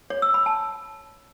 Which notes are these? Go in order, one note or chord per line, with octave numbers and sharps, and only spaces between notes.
C#5
E6
B5
A5